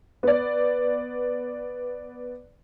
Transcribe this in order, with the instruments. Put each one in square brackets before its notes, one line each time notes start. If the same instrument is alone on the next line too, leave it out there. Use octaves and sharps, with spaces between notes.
[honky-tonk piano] B3 D5